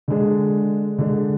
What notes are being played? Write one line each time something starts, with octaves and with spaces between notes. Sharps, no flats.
D3 G#3 D4
D3 G#3 D4